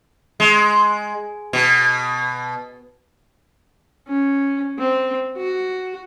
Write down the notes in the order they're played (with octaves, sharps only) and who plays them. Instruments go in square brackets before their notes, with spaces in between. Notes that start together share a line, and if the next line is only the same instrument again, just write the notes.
[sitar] G#3
B2
[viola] C#4
C4
F#4